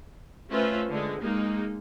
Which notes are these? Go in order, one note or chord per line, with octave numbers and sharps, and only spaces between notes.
A3 C#4 F4 B4 C5 E5
D3 G#3
G#3 A#3 D#4